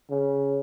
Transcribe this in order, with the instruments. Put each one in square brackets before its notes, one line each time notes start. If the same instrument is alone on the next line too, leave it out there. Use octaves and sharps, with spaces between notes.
[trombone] C#3